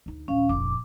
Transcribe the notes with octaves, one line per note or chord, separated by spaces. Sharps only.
D2 D#4
A#1 D#2 C#4 F5
F1 A#1 D6